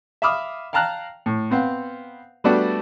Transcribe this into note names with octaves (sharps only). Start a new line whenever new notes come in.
E5 F5 B5 D6 D#6 F6
F5 G5 A5 A#5 F6 F#6
A2
B3 C4 F5 F#5
G3 A3 B3 D4 F#4 D5